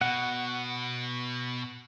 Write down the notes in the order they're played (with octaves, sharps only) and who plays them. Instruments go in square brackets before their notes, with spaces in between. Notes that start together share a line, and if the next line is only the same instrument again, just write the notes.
[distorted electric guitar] B2 [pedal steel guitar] F#5